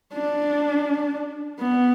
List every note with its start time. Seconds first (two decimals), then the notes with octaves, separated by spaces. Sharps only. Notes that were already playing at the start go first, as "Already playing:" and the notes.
0.14 D4
1.60 B3